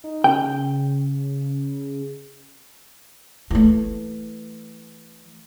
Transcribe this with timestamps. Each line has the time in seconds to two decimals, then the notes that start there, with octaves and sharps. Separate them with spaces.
0.04 D#4
0.24 C#3 G5
3.51 E3 A3